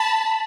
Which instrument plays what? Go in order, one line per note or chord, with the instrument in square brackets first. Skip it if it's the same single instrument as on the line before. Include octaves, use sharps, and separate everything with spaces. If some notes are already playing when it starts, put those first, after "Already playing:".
Already playing: [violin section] A5 B5